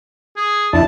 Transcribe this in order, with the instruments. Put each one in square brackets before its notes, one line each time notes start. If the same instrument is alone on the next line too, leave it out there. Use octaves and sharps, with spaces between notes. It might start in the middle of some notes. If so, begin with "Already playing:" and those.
[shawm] G#4
[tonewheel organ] F2 D4 E4 [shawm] A5